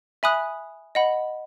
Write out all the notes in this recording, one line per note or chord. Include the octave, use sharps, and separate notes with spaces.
E5 G#5 B5 D#6 F#6
D#5 F#5 B5